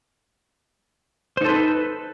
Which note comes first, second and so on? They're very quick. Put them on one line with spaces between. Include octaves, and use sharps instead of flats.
C5 D#4 A4 B4